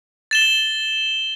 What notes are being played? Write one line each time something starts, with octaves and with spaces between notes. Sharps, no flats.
A6 E7 G7